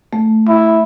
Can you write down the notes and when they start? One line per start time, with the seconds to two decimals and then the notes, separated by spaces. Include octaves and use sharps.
0.13 A3
0.48 E4